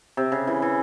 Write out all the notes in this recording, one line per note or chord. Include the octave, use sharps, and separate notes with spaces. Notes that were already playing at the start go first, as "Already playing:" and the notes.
C3
C#3
E3
E3